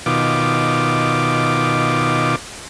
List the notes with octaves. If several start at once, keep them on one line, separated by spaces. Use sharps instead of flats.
B2 D#3 F4 D6